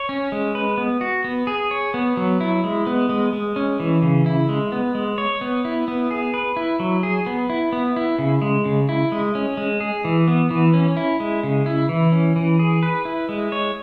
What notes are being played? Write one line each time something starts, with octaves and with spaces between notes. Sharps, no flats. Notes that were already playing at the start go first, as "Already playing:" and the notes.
Already playing: C#5
C#4
G#3
B4
B3
F#4
B3
G#4
C#5
B3
F#3
E4
G#3
B3
G#3
G#3
C#4
E3
C#3
E4
G#3
B3
G#3
C#5
B3
E4
B3
G#4
B4
E4
F#3
G#4
B3
E4
B3
E4
C#3
G#3
C#3
E4
G#3
C#4
G#3
G#4
E3
B3
E3
C#4
E4
G#3
C#3
E4
E3
C#4
E3
G#4
B4
E4
G#3
C#5